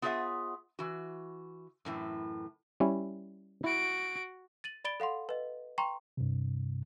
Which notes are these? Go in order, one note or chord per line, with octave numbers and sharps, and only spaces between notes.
B3 F4 G#4 C#5 E5 F#5
E3 F#4
F#2 A2 E3
G3 C#4 E4
E4 F#4 D7
A6 D#7 F#7
D5 B5 A6 D7 G7
A4 F5 F#5 C6
B4 D#5
G5 A#5 C6 C#6
G2 C3